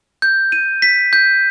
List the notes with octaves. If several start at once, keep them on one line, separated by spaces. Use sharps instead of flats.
G6
D#7
B6
G6